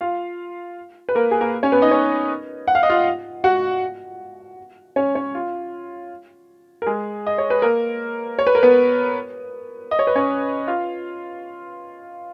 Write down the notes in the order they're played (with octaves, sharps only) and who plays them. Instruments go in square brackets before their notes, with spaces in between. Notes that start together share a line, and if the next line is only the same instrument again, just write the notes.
[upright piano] F4 F5
B4
A#3 A#4
G#4
A#3 A#4
C#4 C#5
B3 B4
D#4 D#5
C#4 C#5
F#5
F5
D#5
F4 F5
F#4 F#5
C#4 C#5
C#4 C#5
F4
A#4
G#3 G#4
D#5
C#5
B4
A#3 A#4
C#5
B4
A#4
B3 B4
D#5
C#5
B4
C#4 C#5
F4 F5